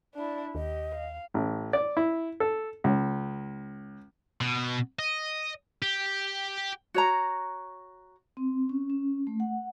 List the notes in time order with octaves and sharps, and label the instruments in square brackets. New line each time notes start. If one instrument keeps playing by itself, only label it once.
[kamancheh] D4 E4 [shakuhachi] D5
[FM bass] D#2 [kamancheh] G4 [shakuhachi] D#5
[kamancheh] F5
[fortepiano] A1
D5
E4
A4
C#2
[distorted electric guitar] B2
D#5
G4
[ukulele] F#4 C#5 A#5
[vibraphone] C4
C#4
C#4
A3
F#5